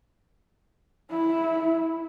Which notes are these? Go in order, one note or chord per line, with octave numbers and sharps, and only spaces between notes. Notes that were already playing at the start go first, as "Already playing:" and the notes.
E4